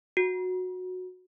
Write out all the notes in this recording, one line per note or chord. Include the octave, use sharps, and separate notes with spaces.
F#4